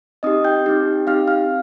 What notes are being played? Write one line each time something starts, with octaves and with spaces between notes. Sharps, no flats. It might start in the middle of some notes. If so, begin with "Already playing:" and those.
C4 D#4 G4 D#5 D#6
G5 G6
C4 D#4 G4
C4 D#4 G4 F5 F6
F5 F6